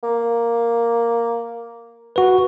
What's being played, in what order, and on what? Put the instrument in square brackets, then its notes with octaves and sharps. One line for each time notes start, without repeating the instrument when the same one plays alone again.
[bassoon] A#3
[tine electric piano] F#4 B4